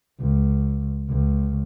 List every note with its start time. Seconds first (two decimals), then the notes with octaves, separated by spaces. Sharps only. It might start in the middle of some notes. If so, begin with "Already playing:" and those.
0.20 C#2
1.10 C#2